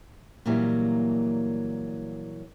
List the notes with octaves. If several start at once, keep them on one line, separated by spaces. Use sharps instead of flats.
A#2 E3 F#3 G3 A#3